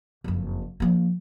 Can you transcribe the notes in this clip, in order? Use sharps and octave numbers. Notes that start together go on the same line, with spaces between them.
F#1 F2
F3 A#3